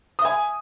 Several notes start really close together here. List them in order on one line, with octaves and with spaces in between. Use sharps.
D#6 E5 G#5